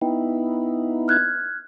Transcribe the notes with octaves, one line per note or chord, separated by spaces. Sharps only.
B3 D#4 E4 G5
F6 F#6 G#6